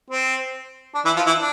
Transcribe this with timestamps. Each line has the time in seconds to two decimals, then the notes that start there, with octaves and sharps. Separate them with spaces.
0.10 C4
0.95 D4
1.05 E3 E4
1.16 F3 F4
1.26 E3 E4
1.38 D4